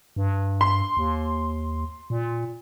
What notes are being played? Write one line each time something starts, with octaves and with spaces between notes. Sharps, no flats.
G2
C6
D#2
A#2